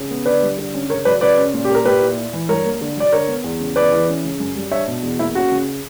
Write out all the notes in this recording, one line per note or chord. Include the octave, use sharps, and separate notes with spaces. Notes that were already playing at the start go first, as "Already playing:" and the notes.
Already playing: C#3
B3
D3 B4 D5
G3
D3
C#4
C#3 A#4 C#5
F#3 B4 D5
C#3 B4 D5
C#4
A#2
G4
A#3
A#4
A#2 G4 B4
E4
E4
E3
G2 A#4 C#5
A#3
D3
F#3 D5
D3 A#4 C#5
B3
E2
C#3
E2 B4 D5
E3
C#4
C#3
F#2
G3
D4 C#5 E5
B2
E2
A#3 E4
C#4 F#4
C#3